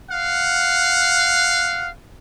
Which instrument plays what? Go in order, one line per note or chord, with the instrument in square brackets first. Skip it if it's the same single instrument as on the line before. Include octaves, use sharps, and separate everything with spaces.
[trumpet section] F5 F#5